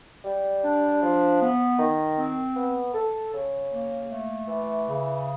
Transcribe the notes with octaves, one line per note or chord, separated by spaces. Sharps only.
G3
D4
F3
B3
D#3
C4
B3
A4
C#3
A#3
A3
E3
C#3